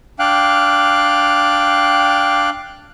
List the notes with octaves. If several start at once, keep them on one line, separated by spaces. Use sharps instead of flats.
D4 F5 G5 F#6